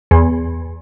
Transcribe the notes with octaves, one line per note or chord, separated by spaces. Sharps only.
E2